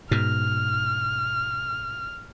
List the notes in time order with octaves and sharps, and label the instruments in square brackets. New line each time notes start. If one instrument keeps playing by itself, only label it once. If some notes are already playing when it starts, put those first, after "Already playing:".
[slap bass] G#2 B2 [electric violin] F6